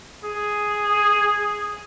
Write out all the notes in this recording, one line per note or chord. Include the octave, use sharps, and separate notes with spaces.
G#4